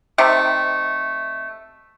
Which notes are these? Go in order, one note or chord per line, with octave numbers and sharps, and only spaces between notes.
C3 D#3 A3